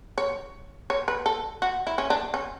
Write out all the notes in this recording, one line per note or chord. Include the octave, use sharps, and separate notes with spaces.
C#5
C#5
B4
A4
F#4
E4
C#4
D4
C#4